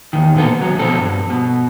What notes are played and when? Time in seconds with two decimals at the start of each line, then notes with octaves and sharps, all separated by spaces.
0.13 E2 D#3
0.35 B1 A#2 D3 B3 A4
0.59 C#2 F#3
0.79 B2 F3 C4 A4
0.99 G2
1.30 B2